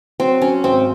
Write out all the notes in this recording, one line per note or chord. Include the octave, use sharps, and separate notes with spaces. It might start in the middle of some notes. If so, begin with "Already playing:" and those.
F#3 C4
F#3 C#4
G#1 C4